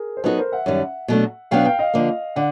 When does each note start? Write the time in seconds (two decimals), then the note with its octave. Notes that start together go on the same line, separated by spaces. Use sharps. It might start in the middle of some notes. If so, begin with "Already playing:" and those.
Already playing: G#4 A#4
0.17 C5
0.24 F#3 B3 D#4 F#4 A4 B4
0.38 A#4 C5
0.52 E5 F#5
0.66 F#2 D#3 G3
1.08 B2 F#3 A3 D4
1.51 B2 F#3 B3 D4 F5 G5
1.65 F5 G5
1.79 D#5 F5
1.94 D3 F3 A#3
2.36 D3 F#5